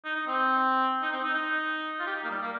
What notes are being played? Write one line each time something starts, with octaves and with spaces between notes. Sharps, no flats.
D#4
D#4
C4
D#4
C4
D#4
D#4
F4
G4
D#4
A#3
G3
A#3